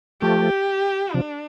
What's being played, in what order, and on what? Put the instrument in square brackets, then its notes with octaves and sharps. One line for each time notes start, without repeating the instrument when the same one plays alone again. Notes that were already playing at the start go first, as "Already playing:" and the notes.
[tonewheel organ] F3 A3 [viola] G4
[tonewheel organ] C3 F3 [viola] D4